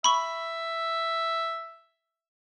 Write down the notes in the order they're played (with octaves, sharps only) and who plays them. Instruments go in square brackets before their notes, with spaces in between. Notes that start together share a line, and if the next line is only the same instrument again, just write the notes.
[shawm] E5 [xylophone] B5 C#6